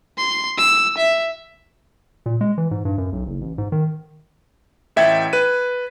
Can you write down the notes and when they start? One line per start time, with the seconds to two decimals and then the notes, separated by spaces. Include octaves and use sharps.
0.18 C6
0.58 E6
0.97 E5
2.26 A#2
2.41 G#3
2.58 E3
2.71 G#2
2.85 G2
2.98 F#2
3.13 B1
3.26 F#1
3.41 A1
3.58 G#2
3.72 D#3
4.96 A1 E5 G5 G#6 A6 C#7
5.33 B4 D#7